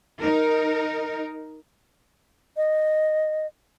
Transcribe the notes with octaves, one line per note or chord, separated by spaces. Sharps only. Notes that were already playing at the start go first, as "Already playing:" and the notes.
D#4 A#4
D#5